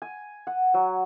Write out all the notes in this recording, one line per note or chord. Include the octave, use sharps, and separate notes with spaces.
G#5
F#5
F#3